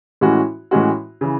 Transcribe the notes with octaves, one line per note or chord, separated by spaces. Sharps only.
A2 E3 G#3 C#4 F#4
A2 E3 G#3 C#4 F#4
C#3 E3